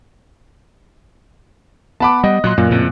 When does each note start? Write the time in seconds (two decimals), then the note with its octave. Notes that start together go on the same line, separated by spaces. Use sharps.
2.00 B3 F#5 A5 B5 D6
2.24 G3 D#5
2.44 A#2 F#3 C6 F#6
2.58 F#2 A#2
2.71 F2 A2 C#3